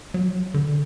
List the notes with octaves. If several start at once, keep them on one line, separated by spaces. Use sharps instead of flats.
F#3
D3